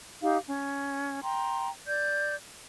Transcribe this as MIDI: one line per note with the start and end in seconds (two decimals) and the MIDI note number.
0.22 0.38 63
0.22 0.38 67
0.22 0.38 77
0.47 1.23 61
1.23 1.69 79
1.23 1.69 82
1.23 1.69 84
1.87 2.36 74
1.87 2.36 91